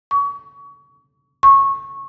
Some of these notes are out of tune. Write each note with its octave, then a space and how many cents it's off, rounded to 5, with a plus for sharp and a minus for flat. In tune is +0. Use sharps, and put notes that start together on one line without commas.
C#6 +30
C#6 -15